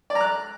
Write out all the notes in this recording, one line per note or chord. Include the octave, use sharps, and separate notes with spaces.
D5
A#5
F#6